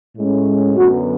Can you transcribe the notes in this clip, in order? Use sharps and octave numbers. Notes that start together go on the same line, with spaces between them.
A2 G#3 C#4
F#2 D3 F#3 B3 F#4